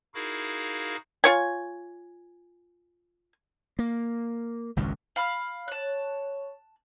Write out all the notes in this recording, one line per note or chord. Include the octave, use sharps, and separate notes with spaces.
D#4 E4 F#4 G#4 A#4 F5
F4 C#5 G#5
A#3
G#1 C#2 F#2
F5 B5 F6
C#5 A5 F#6